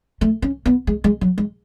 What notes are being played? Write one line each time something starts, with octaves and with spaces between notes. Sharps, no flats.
A3
C#4
B3
G#3
G#3
F#3
G#3